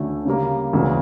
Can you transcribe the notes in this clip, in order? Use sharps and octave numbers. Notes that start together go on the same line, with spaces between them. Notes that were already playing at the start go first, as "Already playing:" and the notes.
Already playing: D2 D3 A3 C#4
C#3 G3 A#3
E1 D2 C#3 E3